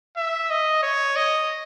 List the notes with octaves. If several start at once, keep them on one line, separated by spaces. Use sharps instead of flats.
E5
D#5
C#5
D#5